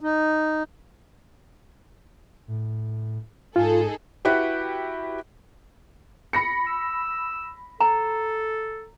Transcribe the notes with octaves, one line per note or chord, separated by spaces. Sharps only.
D#4
A2
G#2 D#4 F4 G#4 A4
E4 F#4 G4 B4
B5 A#6 C#7
E6
A4 A#5